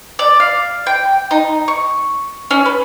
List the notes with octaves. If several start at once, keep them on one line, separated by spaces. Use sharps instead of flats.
D5
F5
G5
D#4
C#6
C#4
B4